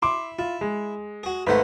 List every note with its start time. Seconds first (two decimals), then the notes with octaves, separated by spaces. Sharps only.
0.02 E4 C6 D6
0.39 E4 F4
0.61 G#3
1.23 F#4 G#4
1.47 G#1 A3 B4 C5 F#5